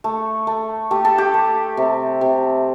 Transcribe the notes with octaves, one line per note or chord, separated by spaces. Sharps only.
A3
A3
A3 G4
A4
G4
A3
C3
C3